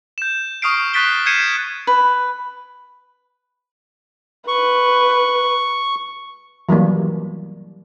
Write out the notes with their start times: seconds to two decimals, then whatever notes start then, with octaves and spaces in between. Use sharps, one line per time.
0.18 G6 E7
0.62 C#6 D#6 F6 C7 D7
0.94 C#6 F#6 A6 B6 D7 G7
1.26 G6 G#6 C7 C#7 D#7 E7
1.87 B4
4.48 B4 C#6
6.69 E3 F#3 G3 A#3